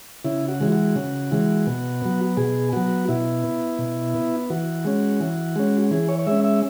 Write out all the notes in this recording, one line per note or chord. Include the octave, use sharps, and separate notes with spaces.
C#3 E4
F#4
E3 G#3
F#4
C#3
E3 G#3
B2
F#3 B3
B2 G#4
F#3 B3 F#4
B2 E4
B3
B2
B3
E3 F#4
G#3 C#4
E3
G#3 C#4
E3 G#4
C#5
C#5
G#3 C#4 E5
E5